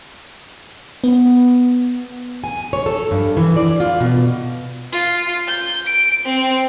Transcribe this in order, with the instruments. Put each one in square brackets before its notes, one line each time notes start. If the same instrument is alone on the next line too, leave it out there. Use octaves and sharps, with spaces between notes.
[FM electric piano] B3
[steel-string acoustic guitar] G#5
C#5
A4
G2
E3
D5
F4
B2
[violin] F4
G6
D7
C4